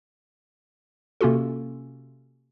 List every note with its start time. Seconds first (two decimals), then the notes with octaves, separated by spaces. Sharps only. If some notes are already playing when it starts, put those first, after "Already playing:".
1.21 C3 A#3 C#4 F4 F#4 A4